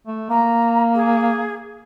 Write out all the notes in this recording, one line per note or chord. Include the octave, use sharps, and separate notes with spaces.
A3
A#3 A#5
G#4